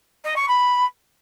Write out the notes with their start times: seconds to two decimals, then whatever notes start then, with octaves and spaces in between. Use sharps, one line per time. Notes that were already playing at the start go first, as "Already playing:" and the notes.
0.24 D#5
0.36 C#6
0.48 B5